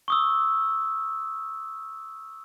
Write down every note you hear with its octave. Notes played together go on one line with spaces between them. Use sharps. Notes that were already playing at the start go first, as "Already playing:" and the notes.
C#6 D#6 E6